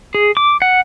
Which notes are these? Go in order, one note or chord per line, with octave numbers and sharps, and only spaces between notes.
G#4
D6
F#5